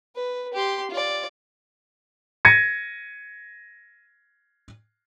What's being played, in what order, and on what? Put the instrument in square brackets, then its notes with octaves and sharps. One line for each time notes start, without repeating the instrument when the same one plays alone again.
[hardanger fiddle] B4
G4 C6
F4 D5
[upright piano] G#6 A#6 C#7 D#7